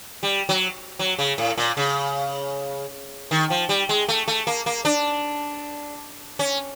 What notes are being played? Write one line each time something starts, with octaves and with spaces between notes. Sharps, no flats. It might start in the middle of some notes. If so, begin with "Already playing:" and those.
G3
F#3
F#3
C#3
A2
A#2
C#3
D#3
F3
G3
G#3
A3
A3
A#3
A#3
D4
C#4